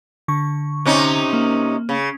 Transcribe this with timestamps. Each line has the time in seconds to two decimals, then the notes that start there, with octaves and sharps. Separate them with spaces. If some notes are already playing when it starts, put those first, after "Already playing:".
0.28 D3 C#6
0.86 C3 C#4 D#4
1.33 A#3
1.89 C#3